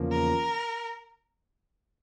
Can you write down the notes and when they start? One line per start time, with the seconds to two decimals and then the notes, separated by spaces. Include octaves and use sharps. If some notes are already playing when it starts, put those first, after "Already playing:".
Already playing: E2 C#3 F3 A#3
0.12 A#4